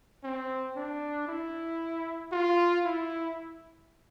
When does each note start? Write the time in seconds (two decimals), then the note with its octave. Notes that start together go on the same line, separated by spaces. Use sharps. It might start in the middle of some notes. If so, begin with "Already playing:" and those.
0.23 C4
0.76 D4
1.28 E4
2.32 F4
2.84 E4